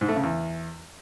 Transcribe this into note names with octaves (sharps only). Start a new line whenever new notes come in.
G#2
A3
C#3
E2